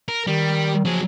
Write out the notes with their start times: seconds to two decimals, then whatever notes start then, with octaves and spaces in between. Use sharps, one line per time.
0.09 A#4
0.27 D#3 G3
0.85 F3 F#3 G#4